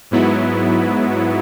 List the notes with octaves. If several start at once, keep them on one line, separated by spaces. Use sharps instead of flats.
G#2 F#3 B3 E4